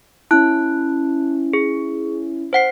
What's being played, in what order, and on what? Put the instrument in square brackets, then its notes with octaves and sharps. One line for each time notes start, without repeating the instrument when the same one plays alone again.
[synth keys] C#4 E4 [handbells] A5 F#6
[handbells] G#4
C5 F#5 C7